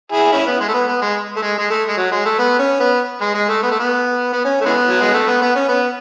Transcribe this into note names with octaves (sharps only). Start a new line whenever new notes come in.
E4 G#4
C#4 E4
B3
G#3
A3
B3
B3
G#3
A3
G#3
G#3
A3
G#3
F#3
G#3
A3
B3
C#4
B3
G#3
G#3
A3
B3
A3
B3
B3
C#4
A3
E3 G#3 B3
F#3
G#3
A3
B3
B3
C#4
B3